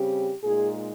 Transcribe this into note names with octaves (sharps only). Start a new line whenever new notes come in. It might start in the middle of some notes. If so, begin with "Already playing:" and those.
Already playing: C#3 G3 C4 G4
A#2 G#3 D#4 G#4